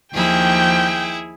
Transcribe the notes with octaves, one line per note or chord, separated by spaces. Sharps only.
D#2 F3 E4 G#4 G5